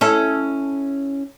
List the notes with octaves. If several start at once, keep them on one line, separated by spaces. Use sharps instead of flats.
C#4 E4 A4